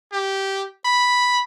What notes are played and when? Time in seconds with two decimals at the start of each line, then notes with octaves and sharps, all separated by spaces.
0.12 G4
0.85 B5